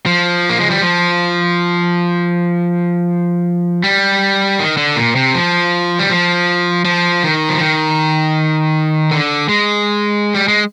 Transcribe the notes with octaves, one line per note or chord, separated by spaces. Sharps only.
F3
A#3
G#3
G3
F3
G3
D#3
D3
A#2
C3
F3
G3
F3
F3
D#3
F3
D#3
D3
G#3
G3
G#3